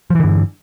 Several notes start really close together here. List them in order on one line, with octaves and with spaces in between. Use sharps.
F3 E3 D3 G2